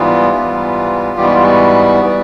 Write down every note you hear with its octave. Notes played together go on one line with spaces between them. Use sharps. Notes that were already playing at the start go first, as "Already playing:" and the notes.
Already playing: G#2 E3 G3 B3 F4
G#2 E3 G3 B3
G#2 E3 G3 B3 G4
F#4
F4
F#4
E3 G3 B3